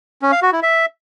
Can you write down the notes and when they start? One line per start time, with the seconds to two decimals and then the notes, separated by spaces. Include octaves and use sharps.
0.22 C#4
0.32 F5
0.42 F#4
0.52 E4
0.63 E5